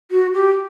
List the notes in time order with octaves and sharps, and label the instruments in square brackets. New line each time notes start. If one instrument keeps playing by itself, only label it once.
[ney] F#4
G4